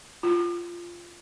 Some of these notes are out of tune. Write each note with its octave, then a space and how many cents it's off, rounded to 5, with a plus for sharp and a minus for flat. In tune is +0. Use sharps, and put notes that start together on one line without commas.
F4 -10